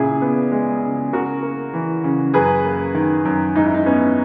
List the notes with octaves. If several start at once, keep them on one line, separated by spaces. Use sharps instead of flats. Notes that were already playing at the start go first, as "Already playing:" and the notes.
Already playing: A#2 C#3 E4 G#4
B3
G#3
C#3
C#3 F#4 A#4
A#3
E3
C#3
F#2 G#4 B4
A#3
D#3
F#2
G#2 D#4
E4
D#4
B3 C#4